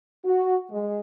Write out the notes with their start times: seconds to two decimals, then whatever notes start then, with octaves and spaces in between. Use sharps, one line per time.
0.25 F#4
0.70 G#3